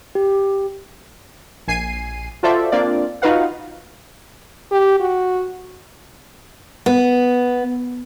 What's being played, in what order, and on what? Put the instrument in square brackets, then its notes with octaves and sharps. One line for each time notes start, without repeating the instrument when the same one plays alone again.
[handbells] G4
[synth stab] A#1 G#5 C7 D#7
F4 F#4 A4 C5 D5 E5
A#3 C4 D4 F4 D5
D#4 F4 F#4 B4 F5 F#5
[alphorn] G4
F#4
[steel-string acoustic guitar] B3